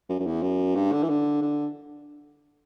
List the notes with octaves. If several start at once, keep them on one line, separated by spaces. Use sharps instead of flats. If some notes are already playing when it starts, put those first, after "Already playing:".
F#2
F#2
E2
F#2
G2
D3
E3
D3
D3